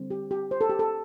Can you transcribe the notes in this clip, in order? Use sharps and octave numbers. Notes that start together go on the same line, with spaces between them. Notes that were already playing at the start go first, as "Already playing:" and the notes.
Already playing: D3 G3 C4
G4
G4
C5
A4
G4
A4